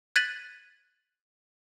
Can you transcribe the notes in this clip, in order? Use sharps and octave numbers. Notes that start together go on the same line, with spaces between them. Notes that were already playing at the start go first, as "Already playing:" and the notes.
F#6 G#6 A6 B6 D#7 F#7